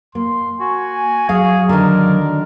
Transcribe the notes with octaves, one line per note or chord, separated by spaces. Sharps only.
A#3 C6
F#4 G#5
F#3 G#4 F5
D3 D#3 A#4 D5